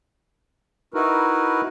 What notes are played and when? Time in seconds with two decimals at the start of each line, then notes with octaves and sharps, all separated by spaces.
0.94 D#4 E4 F#4 A#4 B4